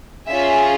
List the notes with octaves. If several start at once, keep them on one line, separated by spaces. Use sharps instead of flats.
C#4 F4 G#4 E5